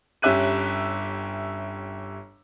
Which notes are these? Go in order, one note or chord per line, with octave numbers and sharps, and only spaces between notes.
G1 C#4 G4 E5 F#6 D#7